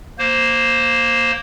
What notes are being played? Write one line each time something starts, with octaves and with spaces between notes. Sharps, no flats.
A#3 C5